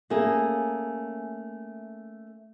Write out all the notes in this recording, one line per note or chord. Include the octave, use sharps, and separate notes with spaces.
A3 A#3 C#4 G#4